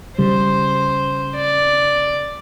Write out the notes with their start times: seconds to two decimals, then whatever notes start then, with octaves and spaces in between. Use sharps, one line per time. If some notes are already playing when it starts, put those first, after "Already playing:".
0.19 C#3 G3 C5
1.35 D5